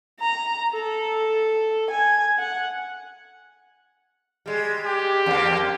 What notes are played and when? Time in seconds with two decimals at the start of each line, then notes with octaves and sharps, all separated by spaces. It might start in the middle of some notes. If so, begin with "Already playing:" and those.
0.20 A#5
0.73 A4
1.90 G#5
2.39 F#5
4.46 G3 G#3
4.86 G4
5.26 E2 A#3